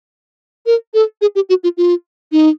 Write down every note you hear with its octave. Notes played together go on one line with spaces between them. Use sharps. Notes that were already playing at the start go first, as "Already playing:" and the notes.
A#4
A4
G#4
G4
F#4
F4
F4
D#4